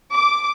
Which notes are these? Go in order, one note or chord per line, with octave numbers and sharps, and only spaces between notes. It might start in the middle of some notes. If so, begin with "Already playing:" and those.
D6